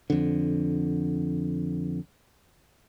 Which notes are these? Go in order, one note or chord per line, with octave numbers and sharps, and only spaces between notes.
F2 D3